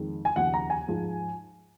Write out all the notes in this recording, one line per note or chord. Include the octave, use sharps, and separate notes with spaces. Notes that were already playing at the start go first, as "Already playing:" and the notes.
Already playing: F2 D#3 G#3
G#5
D#2 C#3 F3 F#5
A#5
G#5
G#2 F3 G#3